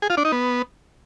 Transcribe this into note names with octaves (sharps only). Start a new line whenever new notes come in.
G#4
F4
D4
D#4
B3